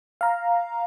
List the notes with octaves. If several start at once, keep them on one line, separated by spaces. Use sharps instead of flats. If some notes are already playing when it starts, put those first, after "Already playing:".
F5 A#5